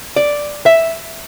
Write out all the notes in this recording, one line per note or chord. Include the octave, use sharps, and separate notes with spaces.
D5
E5